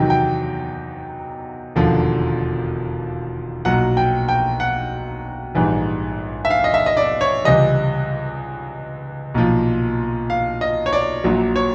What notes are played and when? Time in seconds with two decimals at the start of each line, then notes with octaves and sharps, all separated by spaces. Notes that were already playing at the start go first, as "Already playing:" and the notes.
Already playing: E2 C3 D#3 F#3 G5
0.10 G5
1.76 E1 D#2 D3 F3
3.65 B1 A#2 F#3 F#5
3.97 G5
4.28 G5
4.60 F#5
5.55 A#1 G#2 E3 G3
6.45 E5
6.50 F5
6.64 D#5
6.74 E5
6.86 D#5
6.97 D5
7.21 C#5
7.44 C#2 C3 E3 G3 D#5
9.34 B1 A#2 F3
10.30 F5
10.61 D#5
10.86 C#5
10.93 D5
11.24 A#1 A#2 F#3
11.56 C#5